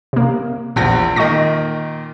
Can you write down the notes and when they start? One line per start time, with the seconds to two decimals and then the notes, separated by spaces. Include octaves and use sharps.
0.13 C3 A#3
0.76 A#1 E2 A#2 F3 A#6
1.16 A#2 D#3 D#5 C#6 A#6